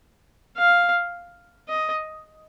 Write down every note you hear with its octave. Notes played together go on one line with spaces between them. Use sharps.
F5
D#5